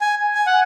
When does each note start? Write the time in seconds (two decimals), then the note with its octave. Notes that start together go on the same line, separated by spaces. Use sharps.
0.01 G#5
0.35 G#5
0.46 F#5